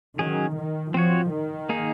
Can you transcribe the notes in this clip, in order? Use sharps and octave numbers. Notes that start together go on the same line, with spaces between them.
D#3 F#3 C#4 G#4
D#3
F3 C4 F#4 C#5
D#3
A#3 D#4 G#4